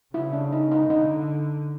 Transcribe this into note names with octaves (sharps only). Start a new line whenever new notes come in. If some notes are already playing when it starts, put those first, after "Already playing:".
C#3 E4
D4
D#4
D#4
D3 D#4